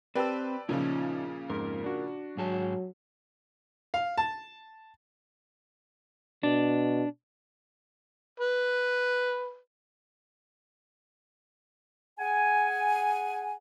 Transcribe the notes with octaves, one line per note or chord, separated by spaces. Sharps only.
C4 G4 B4 D5 A5 E6
A#2 C#3 F3 C#4 D#4
F2 G#2 A#4
D4 F#4
G#2 F#3 G#4 A5
F5
A5
B2 D4
B4
G#4 F#5 G#5